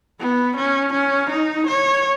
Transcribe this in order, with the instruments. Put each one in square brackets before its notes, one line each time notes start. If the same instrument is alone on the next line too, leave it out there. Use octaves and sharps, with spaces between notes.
[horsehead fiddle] B3
C#4
C#4
D#4
C#5